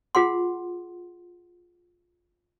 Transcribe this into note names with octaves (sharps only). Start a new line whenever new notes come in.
F4 G#4 F#5 C6